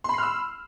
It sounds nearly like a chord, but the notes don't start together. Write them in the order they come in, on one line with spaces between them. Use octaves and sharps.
C6 B5 C7 F6 E6